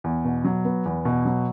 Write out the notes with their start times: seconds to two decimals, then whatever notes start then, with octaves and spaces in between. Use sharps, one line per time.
0.04 E2
0.24 B2
0.44 F#3
0.65 B3
0.85 E2
1.05 B2
1.25 F#3